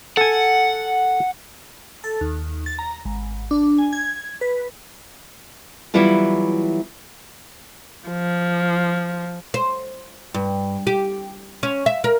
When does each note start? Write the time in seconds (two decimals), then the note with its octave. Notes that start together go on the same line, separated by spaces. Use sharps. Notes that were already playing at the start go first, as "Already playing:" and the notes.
0.17 A4 F#5 G#5
2.04 A4
2.21 D#2
2.66 A6
2.79 A#5
3.05 G#1
3.51 D4
3.78 G#5
3.93 G#6
4.41 B4
5.94 E3 F#3 G3 B3 E4 F4
8.08 F3
9.54 C5
10.34 G2
10.87 G4
11.63 C#4
11.86 E5
12.04 A#4